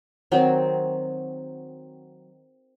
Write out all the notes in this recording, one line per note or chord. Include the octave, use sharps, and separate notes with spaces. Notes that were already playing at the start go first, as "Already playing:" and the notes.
D#3 F#3 C4